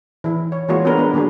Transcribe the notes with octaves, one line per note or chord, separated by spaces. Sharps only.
E3 E4
C#5
E3 G#3 A#3 F4 F#4 C#5
B3 C4 D4 G#4 A#4 B4
G#3 B3 D4 B4
D3 F#3 A#3 D4 G#4